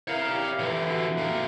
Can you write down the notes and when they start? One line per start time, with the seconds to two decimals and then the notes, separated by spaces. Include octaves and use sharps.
0.08 E4 A#4 C#5 F5
0.29 E4 G4 D5
0.60 D3 E3
0.90 F#4 F#5 G#5
1.18 D3 A#3